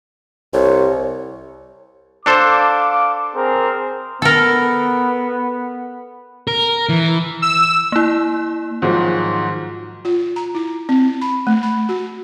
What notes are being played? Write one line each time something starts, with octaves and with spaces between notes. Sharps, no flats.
C2 C#5
D4 A4 C5 F5 D6
C4 G#4 A#4
B3 A4 A#4
A#4
E3
E6
A#3 E4
G#2 D#3 F3 F#3 G#3
F4
A#5
E4
C4
B5
A3
B5
F#4